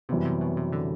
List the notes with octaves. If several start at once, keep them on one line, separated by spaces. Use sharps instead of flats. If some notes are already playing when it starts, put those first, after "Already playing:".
F#2 C3 E3 G3 B3
C3
B2
C3
D3